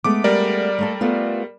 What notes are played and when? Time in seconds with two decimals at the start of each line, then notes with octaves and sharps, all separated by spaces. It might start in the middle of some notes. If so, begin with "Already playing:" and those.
0.04 G#3 A3 B3 D6
0.24 G3 A#4 D5
0.79 A3 A#3 A4
1.01 A3 B3 F4